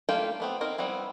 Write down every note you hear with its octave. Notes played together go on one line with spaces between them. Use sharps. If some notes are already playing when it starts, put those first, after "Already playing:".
G3 A3 A#3 F4 G5
A3 B3 C4
C4 D#4 A#4
G3 B3 C4 E4